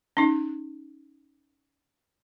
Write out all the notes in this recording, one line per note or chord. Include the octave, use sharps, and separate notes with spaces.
C#4 D#4